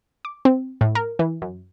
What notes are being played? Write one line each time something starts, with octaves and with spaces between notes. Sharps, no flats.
D6
C4
A2
A#4
E3
F#2